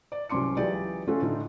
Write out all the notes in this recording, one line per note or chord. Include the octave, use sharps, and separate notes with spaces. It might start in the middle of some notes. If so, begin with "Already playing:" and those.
D5
C2 F#3 C#4 C6 D6 C#7
C#2 E3 F#3 G4 G#4 D5
A3 C#4 F4 F#4 A4
A2 D3 A3 D#4 F4